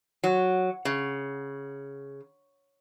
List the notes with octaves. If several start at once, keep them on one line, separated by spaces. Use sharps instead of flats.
F#3
C#3